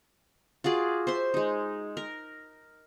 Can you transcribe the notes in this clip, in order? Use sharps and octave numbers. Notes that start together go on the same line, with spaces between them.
F4 F#4 G#4 D5
C5 E5 C6
G#3 D#4
A#4